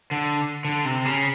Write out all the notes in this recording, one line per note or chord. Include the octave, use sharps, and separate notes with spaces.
D3
D3
C3
C#3